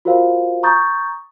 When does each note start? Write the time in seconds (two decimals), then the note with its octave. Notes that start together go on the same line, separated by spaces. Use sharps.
0.05 F4 F#4 A#4 C5 F5
0.63 A#5 C#6 D#6 G6 A6